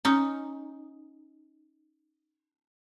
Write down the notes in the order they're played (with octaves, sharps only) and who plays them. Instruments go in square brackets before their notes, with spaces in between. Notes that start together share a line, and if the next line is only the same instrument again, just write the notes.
[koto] C#4 D#4